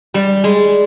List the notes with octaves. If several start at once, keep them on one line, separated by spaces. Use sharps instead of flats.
G3
G#3